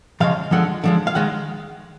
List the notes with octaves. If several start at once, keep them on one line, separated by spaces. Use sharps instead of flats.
C#3 F3 G#3 F5
D3 F3 G#3 F#5
D3 F3 G#3
F5
D#3 G#3 F#5